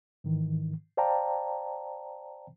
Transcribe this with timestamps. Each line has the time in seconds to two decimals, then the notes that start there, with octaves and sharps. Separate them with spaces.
0.24 G#2 D#3 E3
0.97 C5 D5 F5 G5 A5 A#5